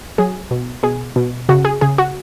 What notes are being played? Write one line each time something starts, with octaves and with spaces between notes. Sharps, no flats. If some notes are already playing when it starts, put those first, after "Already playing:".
F#3 G#4
B2
B2 G#4
B2
C#3 F#4
G#4
C#3 G#4
F#4